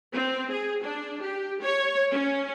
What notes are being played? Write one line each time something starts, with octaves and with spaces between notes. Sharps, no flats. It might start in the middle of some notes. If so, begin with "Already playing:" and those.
C4
G#4
D4
G4
C#5
C#4